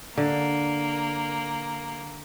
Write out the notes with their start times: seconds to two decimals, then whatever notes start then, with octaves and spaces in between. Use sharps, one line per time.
0.18 D3 A#3